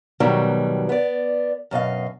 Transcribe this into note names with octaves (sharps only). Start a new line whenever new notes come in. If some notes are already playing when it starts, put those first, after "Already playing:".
G#2 B2 D#3 F#3 G3
B3 D5
F#2 B2 D#5 F5